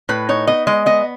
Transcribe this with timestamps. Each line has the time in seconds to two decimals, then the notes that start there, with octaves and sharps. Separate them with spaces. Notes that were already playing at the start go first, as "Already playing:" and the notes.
0.09 A2 B4
0.29 D#4 C#5
0.47 B3 D#5
0.67 G#3 D#5
0.86 B3 D#5